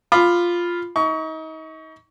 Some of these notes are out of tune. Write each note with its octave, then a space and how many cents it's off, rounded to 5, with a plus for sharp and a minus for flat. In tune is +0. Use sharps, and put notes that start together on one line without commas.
F4 +0 B5 +5 D6 +30
D#4 +35 C#6 +25